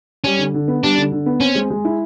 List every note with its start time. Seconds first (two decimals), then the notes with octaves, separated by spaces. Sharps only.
0.24 G3 C#4
0.39 D3
0.54 D3
0.68 B3
0.83 G3 D4
0.98 D3
1.12 D3
1.26 B3
1.40 C4 C#4
1.55 G#3
1.70 G#3
1.85 E4